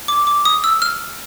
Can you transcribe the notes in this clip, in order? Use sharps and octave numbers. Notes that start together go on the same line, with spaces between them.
D6
D6
D#6
E6
F6